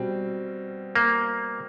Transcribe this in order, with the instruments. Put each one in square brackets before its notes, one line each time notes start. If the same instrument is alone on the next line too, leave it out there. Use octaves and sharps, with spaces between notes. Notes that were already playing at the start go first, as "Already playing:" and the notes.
Already playing: [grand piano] B2 G3 C4
[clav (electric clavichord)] A#3